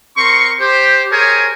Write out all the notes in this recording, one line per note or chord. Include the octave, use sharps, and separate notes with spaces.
C4 A#4 C6 C#6
G4 C5
G4 G#4 A#4 C5 C#5 G#5